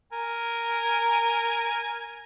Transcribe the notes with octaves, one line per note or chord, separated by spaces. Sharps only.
A#4 G#5